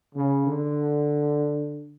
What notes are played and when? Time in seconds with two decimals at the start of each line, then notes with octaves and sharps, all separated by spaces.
0.15 C#3
0.47 D3